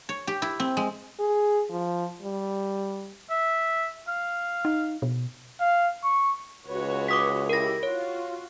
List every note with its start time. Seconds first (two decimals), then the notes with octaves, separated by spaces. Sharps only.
0.09 C#5
0.27 G4
0.42 E4
0.60 C4
0.77 G#3
1.20 G#4
1.71 F3
2.22 G3
3.30 E5
4.08 F5
4.65 D#4
5.02 B2
5.60 F5
6.04 C#6
6.68 C#2 F#4 B4 C#5
7.08 D6 D#6 B6
7.50 E4 G4 A#4 A#6
7.83 F4 F#4 C#5